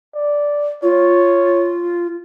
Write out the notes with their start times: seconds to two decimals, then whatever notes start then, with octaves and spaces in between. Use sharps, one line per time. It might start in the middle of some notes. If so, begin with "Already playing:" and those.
0.15 D5
0.83 F4 C#5